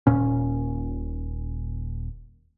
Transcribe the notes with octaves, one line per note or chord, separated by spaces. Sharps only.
D#1 A#2 C#4